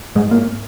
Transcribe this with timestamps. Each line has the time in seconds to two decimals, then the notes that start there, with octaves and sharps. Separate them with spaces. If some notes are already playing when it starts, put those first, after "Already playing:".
0.15 G#2 G#3
0.31 A#3